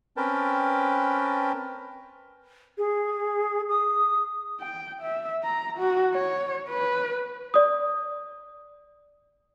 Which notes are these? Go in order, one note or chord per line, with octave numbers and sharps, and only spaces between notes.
C4 C#4 A#4 B4 G5 A5
G#4
D#6
G5
E5
A#5
F#4
C#5
B4
D5 D#6